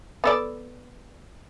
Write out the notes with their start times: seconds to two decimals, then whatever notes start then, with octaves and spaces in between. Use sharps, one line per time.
0.24 B3 A4 D5